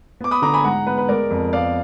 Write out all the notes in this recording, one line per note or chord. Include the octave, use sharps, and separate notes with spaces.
B3 D6
B5 D#6
D3 A#5 D6
G#5 B5
G#2 F#5 A#5
B3 B4
B4
G#3 A#4 D5
F2
B3 D5 F5